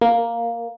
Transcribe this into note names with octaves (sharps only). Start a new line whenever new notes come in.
A#3